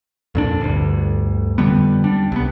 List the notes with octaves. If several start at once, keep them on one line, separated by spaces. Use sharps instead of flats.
F2 A#2 D4
G1 D2
F2 D3 G3 B3
G3 D4
C2 B3